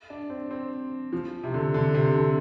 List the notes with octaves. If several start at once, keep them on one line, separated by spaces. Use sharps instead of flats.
D4
C4
C4
F3
C3
D3
D3
C3
D3